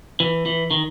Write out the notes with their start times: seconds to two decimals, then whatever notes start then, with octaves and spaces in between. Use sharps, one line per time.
0.20 E3
0.46 E3
0.71 D#3